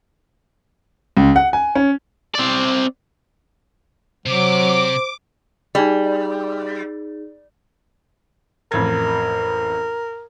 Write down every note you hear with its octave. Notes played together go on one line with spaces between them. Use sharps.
C#2
F#5
G#5
C#4
C4 D5
C3 F#3 C5 D6
G3 D#4 G#4
A1 F2 A#4 G#6